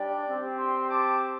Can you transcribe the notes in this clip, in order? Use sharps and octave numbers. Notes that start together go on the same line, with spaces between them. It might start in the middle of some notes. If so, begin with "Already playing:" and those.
Already playing: G3 D4 G4 D5 G5
C4 G4
G5 C6
A5 D6